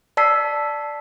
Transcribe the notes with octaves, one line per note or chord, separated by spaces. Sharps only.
D5 A5 E6 B6 C7